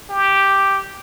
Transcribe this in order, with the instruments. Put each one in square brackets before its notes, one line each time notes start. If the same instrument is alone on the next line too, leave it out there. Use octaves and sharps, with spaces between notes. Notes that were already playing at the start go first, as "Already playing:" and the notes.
[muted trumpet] G4